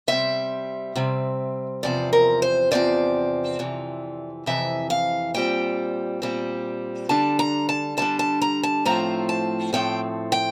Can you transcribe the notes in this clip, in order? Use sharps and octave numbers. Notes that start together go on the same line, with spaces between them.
C3 G3 C4 E5
C3 G3 C4
E2 C3 F3 C4 D5
A#4
C5
E2 C3 F3 C4 D5
F2 C3 E3
F2 C3 E3 E5
F5
A#2 G3 C4 G5
A#2 G3 C4
D3 G3 D4 A5
A#5
A5
D3 G3 D4 A5
A5
A#5
A5
A2 F3 A3 C4 A#5
A5
A2 F3 A3 C4 G5
G5